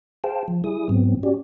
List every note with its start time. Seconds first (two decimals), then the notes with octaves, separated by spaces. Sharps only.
0.24 G#4 C5 F5 G5 A5
0.48 F3
0.64 G3 E4 G#4 D#6
0.89 G#2 F#3 B3 C4
1.23 C#4 F#4 G4 D5